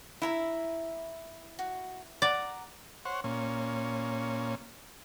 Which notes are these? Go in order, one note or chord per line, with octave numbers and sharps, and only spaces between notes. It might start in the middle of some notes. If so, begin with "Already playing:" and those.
E4 E5 A#5 B5
F#4
D5 F#5 A#5
C5 C#5 F#5
A#2 C#4